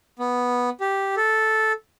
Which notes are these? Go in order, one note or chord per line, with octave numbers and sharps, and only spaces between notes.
B3
G4
A4